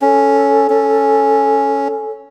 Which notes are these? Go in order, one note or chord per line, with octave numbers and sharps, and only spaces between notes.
C#4 A4
C#4